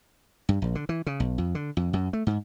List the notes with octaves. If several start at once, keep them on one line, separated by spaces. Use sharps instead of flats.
G2
A#1
D3
E3
C#3
B1
F2
D3
F2
F#2
A3
G#2